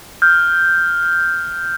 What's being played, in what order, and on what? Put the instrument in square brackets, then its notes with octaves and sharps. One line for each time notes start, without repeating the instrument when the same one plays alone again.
[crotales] F6 G6